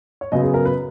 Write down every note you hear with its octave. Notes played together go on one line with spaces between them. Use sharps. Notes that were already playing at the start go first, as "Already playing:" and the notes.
C#5
F#2 C#3 F#3 B3 D#5
G#4
A#4
B4